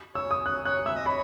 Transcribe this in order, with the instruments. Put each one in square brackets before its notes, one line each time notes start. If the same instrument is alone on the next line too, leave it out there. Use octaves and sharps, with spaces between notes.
[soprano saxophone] C#5 [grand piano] E6
[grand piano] D#6
[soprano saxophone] C#5 [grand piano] F#6
[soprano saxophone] C#5 [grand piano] F#6
[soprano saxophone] E5 [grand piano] E6
[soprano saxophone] D#5
[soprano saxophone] C#5 [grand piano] B5